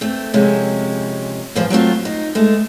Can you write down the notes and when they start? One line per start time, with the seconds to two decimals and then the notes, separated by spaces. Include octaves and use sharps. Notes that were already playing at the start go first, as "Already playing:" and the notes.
0.01 A3 C4
0.34 F2 C3 G#3 C#4
1.55 E2 G2 F3 F4 C5
1.70 F#3 A3 C4 F4
2.05 D#4
2.35 G#3 A3